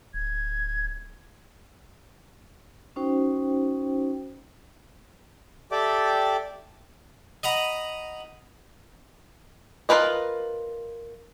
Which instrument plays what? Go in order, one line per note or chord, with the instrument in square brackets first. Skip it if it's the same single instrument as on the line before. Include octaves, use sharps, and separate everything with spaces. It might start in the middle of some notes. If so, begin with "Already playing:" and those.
[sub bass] D1 [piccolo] G#6
[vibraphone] C#4 D#4 F#4 C5 G5
[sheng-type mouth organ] G4 A4 D5 E5 G5 D6
[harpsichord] D#5 F#5 A#5 B5 D#6
[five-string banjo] F4 G#4 A#4 B4 D#5